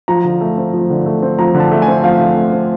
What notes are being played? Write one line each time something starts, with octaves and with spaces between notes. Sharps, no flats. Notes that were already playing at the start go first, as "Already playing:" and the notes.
F3 A#5
D3
A3
C4
F3
D3
A3
C4
F3 A#5
D3
A5
A3
G#5
C4
F3 F5
D3
A3
C4